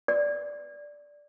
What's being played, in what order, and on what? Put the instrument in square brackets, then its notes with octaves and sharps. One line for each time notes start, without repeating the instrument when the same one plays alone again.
[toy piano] D5